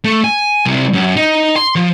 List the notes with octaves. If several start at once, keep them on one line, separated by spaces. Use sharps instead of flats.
A3
G#5
C2
F#2
D#4
C6
F3